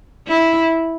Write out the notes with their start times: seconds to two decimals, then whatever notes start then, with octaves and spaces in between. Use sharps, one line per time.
0.27 E4